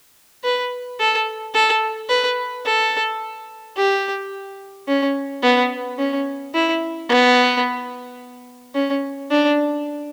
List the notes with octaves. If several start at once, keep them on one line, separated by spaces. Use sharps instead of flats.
B4
A4
A4
B4
A4
G4
C#4
B3
C#4
E4
B3
C#4
D4